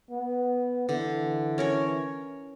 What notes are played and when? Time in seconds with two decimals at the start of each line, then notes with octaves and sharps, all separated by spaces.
0.10 B3
0.89 D3 E3
1.58 C#4 A#4 C#5